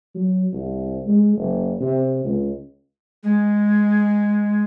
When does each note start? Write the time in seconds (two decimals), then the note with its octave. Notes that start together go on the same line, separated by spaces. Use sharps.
0.15 F#3
0.53 C2
1.07 G#3
1.37 F#1
1.81 C3
2.25 C#2
3.23 G#3